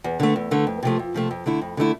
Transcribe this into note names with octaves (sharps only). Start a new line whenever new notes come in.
E2
D3 A3
E2
D3 A3
F2
C3 F3 A3
F2
C3 F3 A3
F2
D3 A3 E4
F2
D3 A3 E4